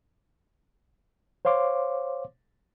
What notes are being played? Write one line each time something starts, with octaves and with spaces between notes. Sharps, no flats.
C5 C#5 F5 C6 D6